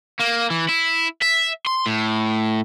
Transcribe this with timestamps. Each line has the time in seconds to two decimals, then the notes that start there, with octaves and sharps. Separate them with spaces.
0.20 A#3
0.50 E3
0.69 E4
1.22 E5
1.67 C6
1.86 A2